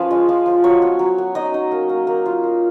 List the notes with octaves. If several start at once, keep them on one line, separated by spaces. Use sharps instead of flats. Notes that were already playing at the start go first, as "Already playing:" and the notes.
Already playing: F3 C#4 F4 B4
G#3
F3
F3
F#3 C#5
B3
F#3
B3
D#4 D#5
D#4
A#3
A#3
A#3
F4
A#3